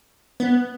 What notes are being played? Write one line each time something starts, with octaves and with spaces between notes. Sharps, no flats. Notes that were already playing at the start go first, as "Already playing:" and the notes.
B3